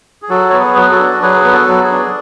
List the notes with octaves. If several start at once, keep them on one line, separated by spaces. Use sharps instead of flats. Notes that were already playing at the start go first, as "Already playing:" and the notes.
G#4
F#3 F#4 A4
B3 C#5
G#4 B4
F#3
G#4
F#4 A4
D4
F#3 G#4 B4
B3 B4
F#4 A4
F#3
G#4
D4